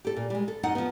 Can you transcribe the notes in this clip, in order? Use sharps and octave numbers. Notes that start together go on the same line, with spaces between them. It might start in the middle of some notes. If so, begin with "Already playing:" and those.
G4 A4
A#2
G3 G#3
A4
F#2 D#4 D#5 F#5
F3 B3